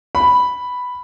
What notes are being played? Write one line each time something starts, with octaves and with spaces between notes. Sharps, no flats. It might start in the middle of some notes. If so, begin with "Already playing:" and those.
B5